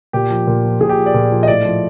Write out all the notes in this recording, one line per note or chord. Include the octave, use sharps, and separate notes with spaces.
A#2 G4
F3
A#2
F3
A#2 G#4
G4
F3
D5
A#2
F3
D#5
A2 D5
F3